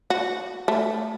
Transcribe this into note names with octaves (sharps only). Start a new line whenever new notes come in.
F#4
A3